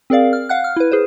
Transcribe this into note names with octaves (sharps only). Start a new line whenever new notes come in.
C4 G#4 A#4 D5 F5
F6
F5 F#5 F#6
F6
E4 B4
G#4 B4 C5